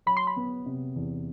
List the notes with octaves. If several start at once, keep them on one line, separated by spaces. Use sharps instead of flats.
F#3 B5
C6
B5
B3
C3
E2